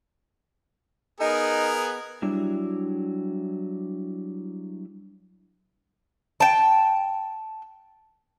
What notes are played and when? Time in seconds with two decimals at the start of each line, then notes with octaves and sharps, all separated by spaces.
1.20 B3 D#4 G#4 A#4
2.22 F#3 G3 D4 E4
6.40 G5 A5